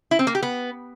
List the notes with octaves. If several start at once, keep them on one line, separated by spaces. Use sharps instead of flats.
E4
C4
A#3
G4
B3